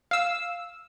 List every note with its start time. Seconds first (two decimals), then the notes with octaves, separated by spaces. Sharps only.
0.11 F5 E6